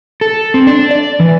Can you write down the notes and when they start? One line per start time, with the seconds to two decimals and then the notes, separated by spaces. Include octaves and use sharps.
0.21 A4
0.54 C4
0.67 D4
0.91 D5
1.20 E3